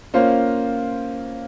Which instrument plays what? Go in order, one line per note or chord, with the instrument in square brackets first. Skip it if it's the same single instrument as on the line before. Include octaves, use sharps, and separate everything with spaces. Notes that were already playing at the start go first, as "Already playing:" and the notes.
[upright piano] A#3 C#4 F4 C5 F5